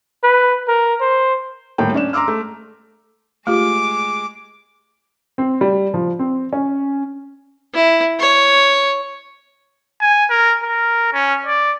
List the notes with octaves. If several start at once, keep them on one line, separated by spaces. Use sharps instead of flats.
B4
A#4
C5
D#1 A2 A#3 G5
C#4 D4 E7
A#5 C6 D6 E6 F6
A3
G#3 A3 F4 G4 D6
C4
G3
F3
C4
C#4
E4
C#5
G#5
A#4
A#4
C#4
D5